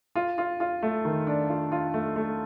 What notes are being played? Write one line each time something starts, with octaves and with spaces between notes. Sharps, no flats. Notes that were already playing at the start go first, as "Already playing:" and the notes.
F4
F4
F4
A3
D#3
D4
F4
F4
A3
A3